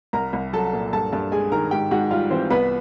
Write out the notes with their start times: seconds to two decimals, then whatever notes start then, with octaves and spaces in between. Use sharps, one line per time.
0.13 C2 A#4 A#5
0.33 C2
0.53 F#3 A4 A5
0.73 A#2
0.93 G2 A4 A5
1.12 G2 A4 A5
1.32 G#3 G#4 G#5
1.52 D#3 A#4 A#5
1.71 G#2 G4 G5
1.91 G#2 F#4 F#5
2.11 G3 F4 F5
2.30 E3 C4 C5
2.50 C2 B3 B4